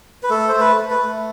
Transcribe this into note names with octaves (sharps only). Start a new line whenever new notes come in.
B4
A3 A4
A3 C5
B4
A3
B4
A3